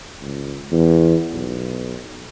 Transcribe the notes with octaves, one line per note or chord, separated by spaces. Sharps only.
C#2
E2
B1